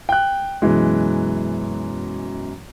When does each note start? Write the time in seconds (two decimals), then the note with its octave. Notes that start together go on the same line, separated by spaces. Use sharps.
0.09 G5 F#6
0.62 F#2 B2 E3 G#3